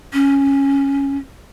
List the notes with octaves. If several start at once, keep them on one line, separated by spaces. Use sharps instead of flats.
C#4